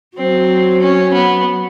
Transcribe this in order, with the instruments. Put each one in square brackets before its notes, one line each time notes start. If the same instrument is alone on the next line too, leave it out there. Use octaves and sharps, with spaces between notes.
[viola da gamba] F#3 [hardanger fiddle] C4
[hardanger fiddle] C#4
B3